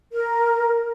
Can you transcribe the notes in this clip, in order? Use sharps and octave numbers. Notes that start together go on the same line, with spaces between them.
A#4